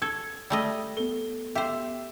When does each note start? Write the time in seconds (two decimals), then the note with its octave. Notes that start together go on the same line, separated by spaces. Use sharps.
0.02 A4 G#6
0.50 G3 A3 D#5
0.97 B3 A4 G7
1.55 G4 C5 E5